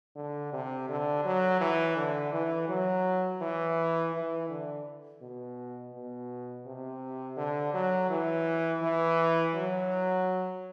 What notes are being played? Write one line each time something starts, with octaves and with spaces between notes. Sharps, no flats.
D3
C3
D3
F#3
E3
D3
E3
F#3
E3
E3
D3
B2
B2
C3
D3
F#3
E3
E3
F#3